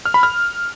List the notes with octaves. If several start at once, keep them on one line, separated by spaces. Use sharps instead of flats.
F6
B5
F6